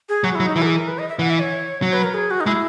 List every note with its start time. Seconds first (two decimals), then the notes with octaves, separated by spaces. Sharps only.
0.09 G#4
0.24 F#3 F#4
0.35 E4
0.40 F#3
0.46 D#4
0.56 E3 E4
0.62 A#4
0.66 G#4
0.77 A#4
0.88 B4
0.99 D#5
1.09 E5
1.19 E3 F#5
1.30 E5
1.41 C#5
1.82 F#3 C#5
1.93 B4
2.03 A#4
2.14 G#4
2.31 F#4
2.41 D#4
2.46 G#3 E4